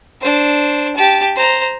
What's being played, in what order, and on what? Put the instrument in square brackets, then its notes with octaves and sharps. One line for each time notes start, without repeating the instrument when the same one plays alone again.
[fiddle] D4 C5
G4 A5
C5 A#5